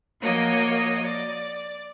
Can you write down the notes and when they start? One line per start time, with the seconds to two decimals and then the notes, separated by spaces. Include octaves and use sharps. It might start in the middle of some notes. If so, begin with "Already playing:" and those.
0.21 F3 A#3 F#4 C#5 D#5
1.04 D5